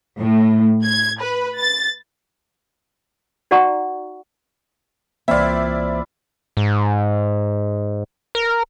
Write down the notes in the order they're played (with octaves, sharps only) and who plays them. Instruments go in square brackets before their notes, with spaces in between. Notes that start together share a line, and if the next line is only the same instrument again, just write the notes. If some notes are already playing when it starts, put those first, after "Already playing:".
[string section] A2
G#6
B4
A6
[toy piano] D#4 F#4 D5 F#5 A#5 C#6
[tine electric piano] C2 E3 A#3 [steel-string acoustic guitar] C4 [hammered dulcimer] E4 F4 [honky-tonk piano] D5 E5
[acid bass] G#2
A#4